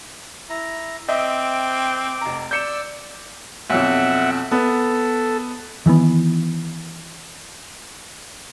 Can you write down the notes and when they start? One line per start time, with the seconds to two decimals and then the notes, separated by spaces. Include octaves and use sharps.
0.49 E4 A#5
1.08 C4 D#5 E5 D6
2.21 F1 A#5
2.51 D5 E6 G6 C#7 E7
3.70 B1 F2 E5 F#5
4.51 B3 A4
5.86 D#3 E3 G3 B3